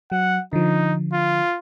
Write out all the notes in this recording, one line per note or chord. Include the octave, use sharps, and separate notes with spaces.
F#3 F#5
D3 F3 D#4
F4